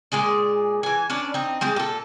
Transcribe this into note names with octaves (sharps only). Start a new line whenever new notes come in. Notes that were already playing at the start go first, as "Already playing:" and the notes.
A#2 G#3 G#4 D5
E3 G#5
C#4 D4 B4 D5
C4 D#4
G3 G#3 C4 G4
A#2 A4